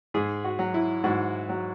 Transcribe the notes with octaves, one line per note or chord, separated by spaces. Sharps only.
G#2 G#4
F#4
F#3
E4
G#2 F#4
F#3